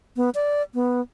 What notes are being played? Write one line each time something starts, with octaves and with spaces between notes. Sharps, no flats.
B3
D5
B3